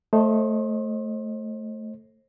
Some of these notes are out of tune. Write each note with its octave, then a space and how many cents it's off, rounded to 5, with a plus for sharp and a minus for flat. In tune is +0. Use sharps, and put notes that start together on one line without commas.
A3 +0 C5 +35 D#5 +0